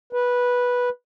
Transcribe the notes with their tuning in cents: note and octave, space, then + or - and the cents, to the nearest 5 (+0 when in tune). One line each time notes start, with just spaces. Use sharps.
B4 -10